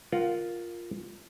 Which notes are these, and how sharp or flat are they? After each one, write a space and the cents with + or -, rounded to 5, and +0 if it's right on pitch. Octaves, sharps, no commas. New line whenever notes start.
F4 +0 A#4 +0 F#5 +30